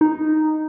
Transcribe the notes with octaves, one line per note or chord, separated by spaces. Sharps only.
D#4